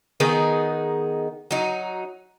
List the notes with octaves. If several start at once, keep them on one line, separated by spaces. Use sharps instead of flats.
D#3 B3 D#4 G#4
F#3 D#4